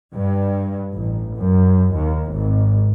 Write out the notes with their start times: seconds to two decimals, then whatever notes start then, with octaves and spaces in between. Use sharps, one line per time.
0.13 G2
0.94 A1
1.37 F#2
1.94 D#2
2.31 G#1